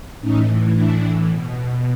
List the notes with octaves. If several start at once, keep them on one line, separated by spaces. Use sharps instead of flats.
A2 E3 C#4 D#4
D4 E4
B2